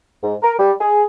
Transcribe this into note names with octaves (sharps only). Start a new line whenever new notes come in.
G#2
A#4
G3
G#4